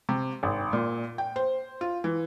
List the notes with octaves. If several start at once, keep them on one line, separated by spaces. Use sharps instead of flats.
C3
G#1
A#2
G5
C5
F4
E3